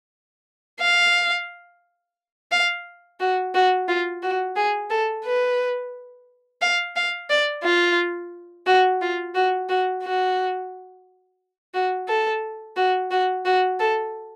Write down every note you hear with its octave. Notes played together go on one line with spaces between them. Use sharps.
F5
F5
F#4
F#4
F4
F#4
G#4
A4
B4
F5
F5
D5
F4
F#4
F4
F#4
F#4
F#4
F#4
A4
F#4
F#4
F#4
A4